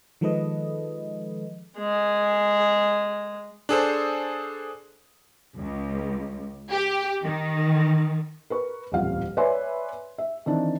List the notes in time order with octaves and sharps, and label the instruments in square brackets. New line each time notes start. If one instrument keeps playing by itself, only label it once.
[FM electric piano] D#3 F3 G#3 A4 B4 D#5
[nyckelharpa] G#3 G#4
[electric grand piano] D4 G#4 A4 C5
[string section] C#2
G4
D#3
[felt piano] A#4 B4 C#6
D#1 A1 F2 F3 F5 F#5
B4 C#5 D5 E5 G#5 C6
E5
D#3 E3 C4 D4